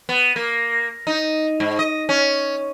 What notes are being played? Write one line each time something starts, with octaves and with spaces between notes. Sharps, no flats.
B3
A#3
D#4
G#2
D#5
C#4